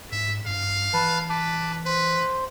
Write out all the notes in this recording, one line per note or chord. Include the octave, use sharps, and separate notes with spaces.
G#2 E5
G2 F5
E3 B4 A5
B4 A5 D6
B4 C5